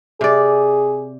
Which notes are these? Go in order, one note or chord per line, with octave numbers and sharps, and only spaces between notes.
C3 G#4 D5